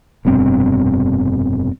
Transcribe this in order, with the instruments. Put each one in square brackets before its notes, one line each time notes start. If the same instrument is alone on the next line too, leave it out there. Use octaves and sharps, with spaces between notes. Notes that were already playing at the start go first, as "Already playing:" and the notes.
[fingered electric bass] F1 G2 B2 C4